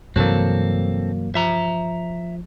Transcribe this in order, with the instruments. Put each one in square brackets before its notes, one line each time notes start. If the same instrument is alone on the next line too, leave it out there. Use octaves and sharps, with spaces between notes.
[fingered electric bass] G2 C3 E3 [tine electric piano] F#3 A#3 [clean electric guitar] C4 A4
[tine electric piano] F3 [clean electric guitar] E5 A#5